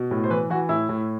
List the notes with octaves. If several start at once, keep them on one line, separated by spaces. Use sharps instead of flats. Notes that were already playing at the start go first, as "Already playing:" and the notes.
Already playing: B2
A2
C5
E3 B4
E3 F#4
A2 E4
A2